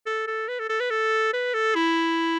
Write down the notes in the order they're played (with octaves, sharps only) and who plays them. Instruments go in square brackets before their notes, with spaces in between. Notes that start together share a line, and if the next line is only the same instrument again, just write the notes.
[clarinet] A4
A4
B4
A4
A4
B4
A4
B4
A4
E4